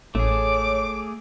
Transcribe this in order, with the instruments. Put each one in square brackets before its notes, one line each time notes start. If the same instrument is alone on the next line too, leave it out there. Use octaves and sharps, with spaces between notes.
[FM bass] A1 [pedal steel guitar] A3 G#4 [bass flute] C#5 [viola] D6